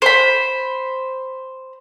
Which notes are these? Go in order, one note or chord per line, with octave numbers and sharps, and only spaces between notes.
C5 B5